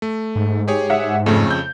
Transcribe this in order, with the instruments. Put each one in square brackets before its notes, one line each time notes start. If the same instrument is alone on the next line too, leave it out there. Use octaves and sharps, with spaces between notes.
[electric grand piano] A3
[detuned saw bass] G#2
[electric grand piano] G4 G#4 C#5
[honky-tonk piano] E5 F#5
[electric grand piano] F2 C#3 [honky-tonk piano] A3
[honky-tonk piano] G6